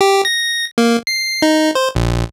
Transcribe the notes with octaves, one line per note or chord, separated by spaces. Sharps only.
G4
A#6
A#3
C7
D#4
C5
A#1